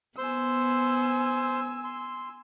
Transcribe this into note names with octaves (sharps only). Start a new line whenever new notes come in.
B3 C5 G#5 C6 E6
C6